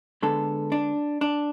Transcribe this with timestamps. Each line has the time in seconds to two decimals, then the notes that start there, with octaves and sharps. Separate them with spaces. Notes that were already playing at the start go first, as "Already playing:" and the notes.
0.23 D3 G#3 B3 A4
0.72 D4
1.21 D4